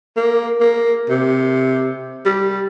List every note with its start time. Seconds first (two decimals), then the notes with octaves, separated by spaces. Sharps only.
0.16 A#3
0.60 A#3
1.09 C3
2.25 G3